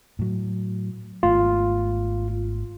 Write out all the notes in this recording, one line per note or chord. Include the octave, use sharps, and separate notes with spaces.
A2 F#3
G#1 A3 B3 F4